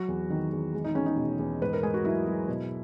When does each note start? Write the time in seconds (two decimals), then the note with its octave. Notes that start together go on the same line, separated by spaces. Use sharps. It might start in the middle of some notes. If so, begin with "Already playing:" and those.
Already playing: F#3 F#4
0.08 E2
0.30 D#3
0.52 E2
0.74 G#3
0.84 D#4
0.95 E2 C#4
1.06 D#4
1.17 B2
1.39 E2
1.61 G#2 B4
1.73 A#4
1.83 G#2 G#4
1.94 F#4
2.04 F#3 E4
2.27 F#3
2.48 B2